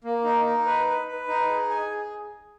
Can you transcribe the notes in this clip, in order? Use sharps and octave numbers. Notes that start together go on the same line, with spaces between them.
A#3
D#4
D#4
B4
B4
B4
D#4
G#4
G#5
G#4